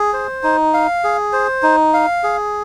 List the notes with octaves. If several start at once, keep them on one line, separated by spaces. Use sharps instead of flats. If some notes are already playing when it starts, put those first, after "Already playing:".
Already playing: G#4
C5
D#4
F5
G#4
C5
D#4
F5
G#4